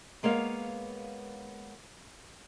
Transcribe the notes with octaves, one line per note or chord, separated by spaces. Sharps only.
G#3 A#3 B3 C#5 F5